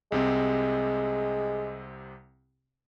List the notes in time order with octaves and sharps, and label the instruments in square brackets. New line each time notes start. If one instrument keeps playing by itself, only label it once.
[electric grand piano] C2 C3 C4 [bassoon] G#3